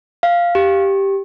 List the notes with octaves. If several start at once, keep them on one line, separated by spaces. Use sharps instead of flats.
F5
G4